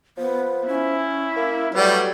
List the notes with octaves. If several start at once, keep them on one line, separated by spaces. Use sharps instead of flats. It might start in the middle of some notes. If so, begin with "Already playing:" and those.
F3 B3
C#4 E4
A#3
F#3 G3 A3 B3 D5